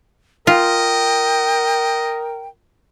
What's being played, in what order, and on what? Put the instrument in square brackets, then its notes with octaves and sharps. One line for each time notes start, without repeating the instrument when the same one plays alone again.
[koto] F4 [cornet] A#4 [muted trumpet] D#5 [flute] G5